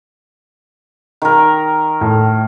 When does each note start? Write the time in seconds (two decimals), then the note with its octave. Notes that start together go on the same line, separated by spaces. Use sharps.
1.22 D#3 A#4
2.01 A2